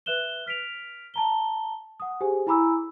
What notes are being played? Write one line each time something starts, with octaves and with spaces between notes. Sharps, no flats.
B4 E5 F#6 E7 G7
F6 B6 D7 F7
A5 A#5 G7
F#5 D#6
G4 G#4 C5 G#5
E4 G#5 A#5 B5 D6 E6